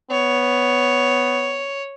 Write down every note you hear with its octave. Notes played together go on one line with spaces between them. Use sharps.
B3 C#5